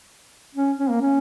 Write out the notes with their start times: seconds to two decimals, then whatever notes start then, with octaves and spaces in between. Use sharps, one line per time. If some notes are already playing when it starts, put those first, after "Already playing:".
0.55 C#4
0.79 C#4
0.90 A#3
1.01 C#4